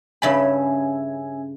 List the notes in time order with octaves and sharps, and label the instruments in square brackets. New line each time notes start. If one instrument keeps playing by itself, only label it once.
[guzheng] G2 C#3 B5 [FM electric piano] C#4 E5 G#5